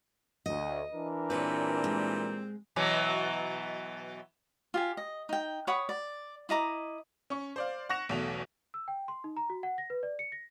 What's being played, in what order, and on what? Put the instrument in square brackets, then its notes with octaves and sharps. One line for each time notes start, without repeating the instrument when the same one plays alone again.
[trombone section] D2 [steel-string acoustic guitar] D#5
[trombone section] E3 D4 A#4
[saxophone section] A#2 G3 C4 [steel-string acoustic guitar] B4 C#5
[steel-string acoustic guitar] G#3
[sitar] B2 E3 F#3
[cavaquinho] F4 G4 G#5
D#5
D#4 G5
C#5 F#5 B5 D#6
D5
E4 D#5 A#5 D6
[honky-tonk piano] C#4 C#6
C5 D5 F5
F#5 C#6 F#6 A#6 E7 F7
B1 E2 B2 A3 F7
[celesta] E6
G5
C6
D#4
A#5
F#4
F#5
A#6
B4
D5
C#7
A#6